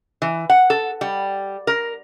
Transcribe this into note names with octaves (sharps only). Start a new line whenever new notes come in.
E3
F#5
A4
G3
A#4